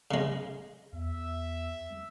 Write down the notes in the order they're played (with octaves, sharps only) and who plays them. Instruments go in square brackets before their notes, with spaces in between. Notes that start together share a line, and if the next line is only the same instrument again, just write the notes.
[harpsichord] C#3 G#3
[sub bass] E2 [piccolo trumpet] E5